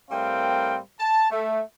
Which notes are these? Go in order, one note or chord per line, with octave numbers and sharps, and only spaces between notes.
A2 G3 C4 A#4 F5 G5
A5
A3 E5